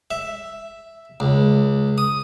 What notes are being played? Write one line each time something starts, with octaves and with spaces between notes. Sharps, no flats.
E5
C#2
D#6